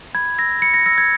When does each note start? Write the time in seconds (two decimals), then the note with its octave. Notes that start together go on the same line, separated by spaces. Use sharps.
0.15 B5 G#6
0.38 E6 A#6
0.62 B5 C#7
0.74 A#6
0.86 E6 A#6
0.98 G#6